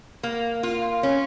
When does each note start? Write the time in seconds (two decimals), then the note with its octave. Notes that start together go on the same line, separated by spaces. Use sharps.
0.23 A#3
0.63 F4
1.03 C#4